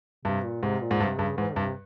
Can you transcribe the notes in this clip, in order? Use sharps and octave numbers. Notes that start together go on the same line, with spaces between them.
G2 C3
A#2
G#2 C3
A#2
G#2
G2 C3
G2 C#3
G#2 E3
G2 C3